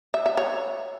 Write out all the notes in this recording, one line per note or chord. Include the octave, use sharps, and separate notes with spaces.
E5
E5
C#5